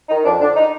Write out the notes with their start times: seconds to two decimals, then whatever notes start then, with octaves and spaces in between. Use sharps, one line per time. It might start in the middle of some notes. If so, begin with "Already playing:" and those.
0.09 D#3 D#4
0.24 F2 D4
0.40 D3 D4
0.56 D#4